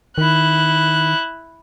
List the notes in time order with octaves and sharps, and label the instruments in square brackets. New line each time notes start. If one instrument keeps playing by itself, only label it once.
[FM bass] D#3 [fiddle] E4 F#6